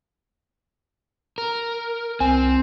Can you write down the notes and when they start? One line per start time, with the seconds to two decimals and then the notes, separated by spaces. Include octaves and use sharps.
1.38 A#4
2.20 C2 C4 G#5